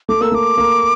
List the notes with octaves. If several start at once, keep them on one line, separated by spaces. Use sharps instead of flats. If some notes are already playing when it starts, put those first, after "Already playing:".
A3 D6
A#3 E6
A3 D6
A#3